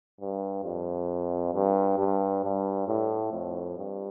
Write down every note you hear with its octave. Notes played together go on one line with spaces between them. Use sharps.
G2
F2
G2
G2
G2
A2
F2
G2